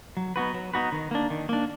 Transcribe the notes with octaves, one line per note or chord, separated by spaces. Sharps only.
F#3
B3 D#4 F#4 B4
F#3
B3 D#4 F#4 B4
D#3
A#3 D4
D#3
A#3 D4